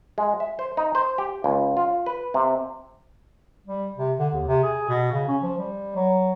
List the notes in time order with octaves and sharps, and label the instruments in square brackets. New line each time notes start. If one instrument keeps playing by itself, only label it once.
[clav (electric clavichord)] G#3
E5
C5
D#4
C5
G4
C#2
F4
B4
C3
[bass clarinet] G3
C3
D3
D#2
C3
G#4
B2
C#3
C#4
F3
G3
F#3